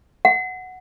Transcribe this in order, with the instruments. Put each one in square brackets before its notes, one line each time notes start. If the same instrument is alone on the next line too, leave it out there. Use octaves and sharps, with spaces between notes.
[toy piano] F#5